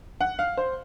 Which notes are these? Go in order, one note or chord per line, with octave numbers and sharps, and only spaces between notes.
F#5
F5
C5